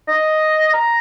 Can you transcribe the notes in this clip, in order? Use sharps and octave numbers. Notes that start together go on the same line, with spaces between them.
D#5
A#5